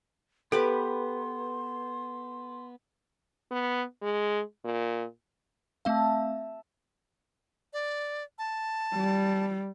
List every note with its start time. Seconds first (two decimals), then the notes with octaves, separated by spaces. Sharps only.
0.52 B3 G4 A4 B4 C6 D6
3.51 B3
4.02 G#3
4.65 A#2
5.85 A3 C4 E5 F5 A5
7.73 D5
8.38 A5
8.95 G3